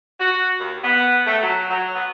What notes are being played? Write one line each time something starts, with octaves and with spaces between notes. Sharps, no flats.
F#4
D#2
B3
A3
F#3
F#3
B3